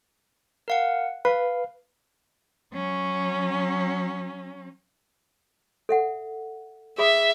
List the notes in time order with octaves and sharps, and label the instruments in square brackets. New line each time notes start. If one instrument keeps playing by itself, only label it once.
[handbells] A#4 F5 F#5
[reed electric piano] B4 [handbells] F5
[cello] F#3 C#4
[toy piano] A4 E5 F#5
[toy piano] G#4 B5 D#6 [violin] E5